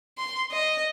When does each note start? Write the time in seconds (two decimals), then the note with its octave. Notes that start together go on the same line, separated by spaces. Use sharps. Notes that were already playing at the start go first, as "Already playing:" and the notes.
0.18 C6
0.51 D#5